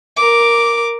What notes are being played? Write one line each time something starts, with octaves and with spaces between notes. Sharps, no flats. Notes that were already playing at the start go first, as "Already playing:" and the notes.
A#4 D6